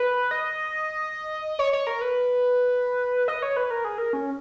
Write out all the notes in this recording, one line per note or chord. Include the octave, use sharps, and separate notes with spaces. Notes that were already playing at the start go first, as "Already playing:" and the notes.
Already playing: B4
D#5
C#5
C#5
A#4
B4
D#5
C#5
B4
A#4
G#4
A#4
C#4